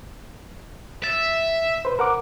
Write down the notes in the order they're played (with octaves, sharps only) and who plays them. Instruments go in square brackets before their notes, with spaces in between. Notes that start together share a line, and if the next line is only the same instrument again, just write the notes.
[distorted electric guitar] E5 [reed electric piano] A6
[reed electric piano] B4 C5
A#4 F#5 D6